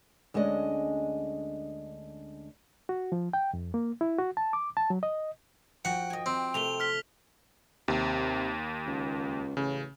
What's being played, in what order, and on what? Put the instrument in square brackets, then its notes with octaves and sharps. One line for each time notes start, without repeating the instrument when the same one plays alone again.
[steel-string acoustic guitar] D2 G#3 C#4 D4 D#5
[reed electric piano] F#4
F3
G5
F2
A#3
E4
F#4
A5
D6
A5
F#3
D#5
[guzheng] F3 F#4 [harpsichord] F#5 [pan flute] G5
[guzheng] D#5 G#5
[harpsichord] C4
[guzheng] C3 A3 [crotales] F7 G7
[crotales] F6 B6 G7
[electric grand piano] D#2 [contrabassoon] C3
[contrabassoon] C#2
[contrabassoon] A1 [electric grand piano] C#3